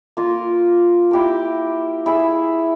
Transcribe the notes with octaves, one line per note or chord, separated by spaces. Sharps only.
A#3 F4 A#4
E4 G4 A#4
E4 G#4 E5